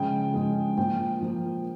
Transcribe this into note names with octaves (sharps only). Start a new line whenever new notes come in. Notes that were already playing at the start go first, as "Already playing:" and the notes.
Already playing: C#3 F3 G#3 G5
C#3 F3 G#3
A#2 F3 A#3 G5
A#2 F3 A#3